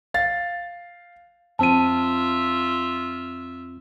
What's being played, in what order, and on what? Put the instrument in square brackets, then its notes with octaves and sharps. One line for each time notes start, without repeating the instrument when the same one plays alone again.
[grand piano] F5 A6
[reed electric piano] F2 C4 [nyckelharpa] F4 E5 [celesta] A5 D#7